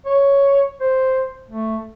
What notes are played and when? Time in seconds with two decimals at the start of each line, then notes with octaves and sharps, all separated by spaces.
0.06 C#5
0.81 C5
1.50 A3